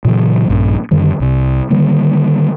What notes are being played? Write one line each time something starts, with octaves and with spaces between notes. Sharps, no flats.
A#2 C#3 E3 F#3
A#1 G2 A#2 C#4
F#2 D3 D#3 G3
C2 C3
D3 D#3 G3 A#3